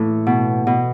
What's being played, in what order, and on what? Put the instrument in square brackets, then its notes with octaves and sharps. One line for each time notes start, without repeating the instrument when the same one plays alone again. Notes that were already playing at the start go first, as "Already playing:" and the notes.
Already playing: [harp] A2 E3
B2
B2